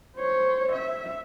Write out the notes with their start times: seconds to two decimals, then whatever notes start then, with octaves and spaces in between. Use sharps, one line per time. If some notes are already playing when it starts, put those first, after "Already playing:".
0.16 C5 C#5
0.72 E5